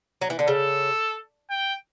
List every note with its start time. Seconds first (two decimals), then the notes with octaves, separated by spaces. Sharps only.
0.21 F#3
0.30 E3
0.39 D3
0.48 C#3 A4
1.50 G5